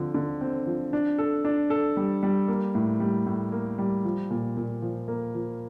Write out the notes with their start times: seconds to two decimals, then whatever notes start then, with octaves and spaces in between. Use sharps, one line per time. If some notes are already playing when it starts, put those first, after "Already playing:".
Already playing: D3 F3 C4
0.14 D3
0.41 C4
0.67 F3
0.93 D4
1.18 A4
1.45 D4
1.70 A4
1.97 G3
2.23 G3
2.48 A#3
2.75 A2
3.00 G3
3.27 A2
3.52 A#3
3.78 G3
4.05 F3
4.30 A#2
4.57 A#2
4.82 F3
5.08 A#3
5.35 F3